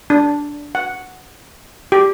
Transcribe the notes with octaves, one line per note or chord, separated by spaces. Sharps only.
D4
F#5
G4